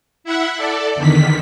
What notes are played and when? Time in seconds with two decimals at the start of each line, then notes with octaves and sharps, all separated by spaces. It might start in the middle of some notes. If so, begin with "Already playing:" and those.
0.24 E4 E5 F#5
0.57 A4 D5
0.96 E2 D3 D#3 B6